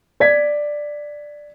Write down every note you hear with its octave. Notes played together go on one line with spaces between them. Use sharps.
D5 G#6 B6